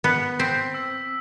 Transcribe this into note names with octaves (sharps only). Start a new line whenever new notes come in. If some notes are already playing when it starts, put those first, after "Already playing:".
B3 B6
C4 B6
E6